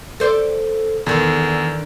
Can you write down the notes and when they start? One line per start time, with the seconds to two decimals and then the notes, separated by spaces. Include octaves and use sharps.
0.20 A4 C5 D5
1.06 E2 D3 D#3